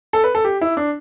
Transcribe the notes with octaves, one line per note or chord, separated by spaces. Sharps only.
A4
B4
A4
G4
E4
D4